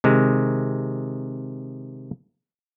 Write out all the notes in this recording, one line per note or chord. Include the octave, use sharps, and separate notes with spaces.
C3 D#3 G#3